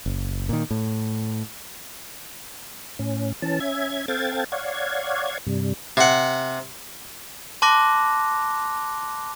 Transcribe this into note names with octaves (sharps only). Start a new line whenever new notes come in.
F#1
A#2 D#3
A2
A2 C#4
E3 C#4 A5
C#4 E5 G#6
C4 A4 F5 G5 G#6 A6
C#5 D5 F5 F#5 G#6
G2 C3 G3
C3 F#5
A5 C6 D6 F#6 A#6